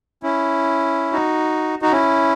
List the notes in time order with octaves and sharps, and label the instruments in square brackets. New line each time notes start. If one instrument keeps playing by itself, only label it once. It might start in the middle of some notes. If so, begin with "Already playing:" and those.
[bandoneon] C#4 E4
D#4 F#4
D#4 F#4
C#4 E4